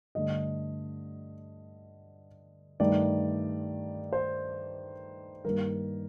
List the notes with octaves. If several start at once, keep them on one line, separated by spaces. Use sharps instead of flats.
G2 D3 A3 D#5
G2 D#3 A3 D5
C5
G2 D#3 G3 A#3 A#4